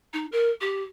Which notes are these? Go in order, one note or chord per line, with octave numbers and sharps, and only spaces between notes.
D#4
A#4
G4